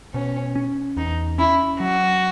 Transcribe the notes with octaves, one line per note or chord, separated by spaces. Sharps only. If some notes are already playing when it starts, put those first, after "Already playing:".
B2 C#4
C#4
E2 D#4
C#4 E4
F#3 F#4